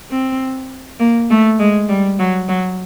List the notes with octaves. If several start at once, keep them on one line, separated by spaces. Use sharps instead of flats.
C4
A#3
A3
G#3
G3
F#3
F#3